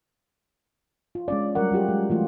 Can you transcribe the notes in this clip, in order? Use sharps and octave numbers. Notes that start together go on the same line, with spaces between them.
F4
G#3 C#4 D5
F#3 G3 A#4 F#5
F#3 F4 G4 G#4
G#3
E3 A3 F4